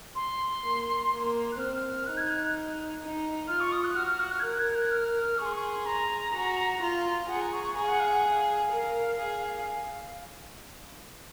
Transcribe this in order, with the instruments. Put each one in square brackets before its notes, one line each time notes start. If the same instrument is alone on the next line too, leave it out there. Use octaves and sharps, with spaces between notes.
[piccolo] C6
[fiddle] A#3
A#3
[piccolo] F#6
[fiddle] C4 [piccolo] F6
[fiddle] D#4 [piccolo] F#6
[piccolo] G#6
F#6
[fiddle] D#4
[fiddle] F4 [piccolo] F6
[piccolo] C#6
D#6
F#6
[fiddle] F#4 [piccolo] F6
[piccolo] F6
F#6
F6
G#6
[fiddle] A#4 [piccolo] F#6
[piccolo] G#6
F#6
F6
[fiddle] G#4 [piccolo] C#6
[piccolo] C6
C#6
C6
A#5
[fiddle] F#4
F4
[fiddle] G#4 [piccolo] F#5
[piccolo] A#5
C#6
C#6
[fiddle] G#4 [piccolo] A#5
[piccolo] F5
F#5
F5
F#5
F5
[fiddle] A#4
G#4